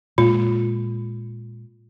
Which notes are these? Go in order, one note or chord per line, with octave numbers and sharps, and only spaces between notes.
A#2 G#3 F4